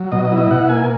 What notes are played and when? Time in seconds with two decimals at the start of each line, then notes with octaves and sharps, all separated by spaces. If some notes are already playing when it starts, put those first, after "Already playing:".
Already playing: F#3
0.12 B2 D#5
0.25 D#5
0.32 E4
0.38 D#5
0.51 B2 F#5
0.69 A#3 G#5